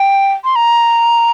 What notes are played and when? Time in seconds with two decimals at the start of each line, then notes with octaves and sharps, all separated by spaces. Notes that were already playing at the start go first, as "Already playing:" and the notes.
Already playing: G5
0.44 C6
0.56 A#5